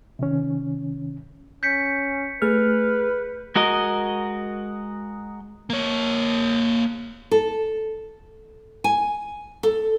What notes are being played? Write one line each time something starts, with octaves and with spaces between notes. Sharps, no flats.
C3 D#3 C#4
C#4 G6 B6 C#7
A3 G#4 B4 F6
G#3 F#4 A#4 D#5
A#3 C#5
A4
G#5
A4